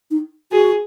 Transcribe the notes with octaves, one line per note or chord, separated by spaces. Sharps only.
D#4
F#4 G#4